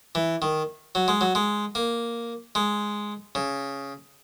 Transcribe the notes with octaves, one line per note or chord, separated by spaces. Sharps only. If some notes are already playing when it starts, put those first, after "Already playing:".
E3
D#3
F#3
G#3
F#3
G#3
A#3
G#3
C#3